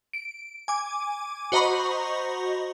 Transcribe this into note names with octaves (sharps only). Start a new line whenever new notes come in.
D7
G#5 D6
F#4 C5 D#5 A#5 B5 C#6